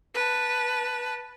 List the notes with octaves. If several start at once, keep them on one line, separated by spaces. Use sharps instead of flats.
B4 A5